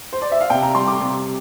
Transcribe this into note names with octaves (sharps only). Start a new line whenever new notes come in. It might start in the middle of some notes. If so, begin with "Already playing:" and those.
C5
D5
E5
F5
C3 G5
A#5
G3 C6
D6
C3